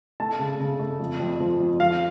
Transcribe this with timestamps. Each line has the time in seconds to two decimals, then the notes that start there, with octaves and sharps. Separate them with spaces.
0.20 A3 A5
0.39 C#3
0.60 C#3
0.79 A3
1.00 F2
1.20 F2
1.40 F3
1.60 F2
1.80 F3 F5